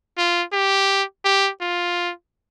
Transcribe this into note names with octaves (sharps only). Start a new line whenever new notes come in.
F4
G4
G4
F4